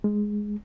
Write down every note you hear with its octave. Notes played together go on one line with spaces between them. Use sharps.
G#3